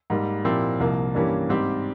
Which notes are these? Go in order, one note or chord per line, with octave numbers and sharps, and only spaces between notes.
G#2 G3 A#3
A#2 F3 C4 E4 G4
C2 C3 F3 A#3
G2 E3 A#3 C#4 G4
G#2 G3 C4 G4